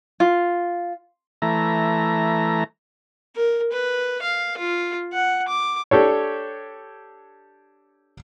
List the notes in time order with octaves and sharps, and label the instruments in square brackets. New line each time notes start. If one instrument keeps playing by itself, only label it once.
[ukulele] F4
[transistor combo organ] E3 A3 A#5
[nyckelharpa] A#4
B4
F5
F4
F#5
D6
[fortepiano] D4 G4 A4 C#5